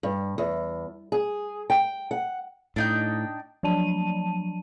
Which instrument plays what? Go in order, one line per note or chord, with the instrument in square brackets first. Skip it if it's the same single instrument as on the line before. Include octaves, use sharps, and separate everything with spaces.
[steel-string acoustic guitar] G2
E2
G#4
G5
F#5
[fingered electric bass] A2 [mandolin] D4 D#4 G5
[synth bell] F3 F#3 D4 A5 D#7